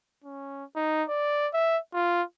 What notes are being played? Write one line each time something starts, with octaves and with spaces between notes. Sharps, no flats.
C#4
D#4
D5
E5
F4